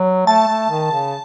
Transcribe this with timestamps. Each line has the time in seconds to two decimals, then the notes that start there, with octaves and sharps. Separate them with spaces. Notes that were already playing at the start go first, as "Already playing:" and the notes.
Already playing: F#3
0.27 A3 A5
0.48 A3
0.70 D#3
0.92 C#3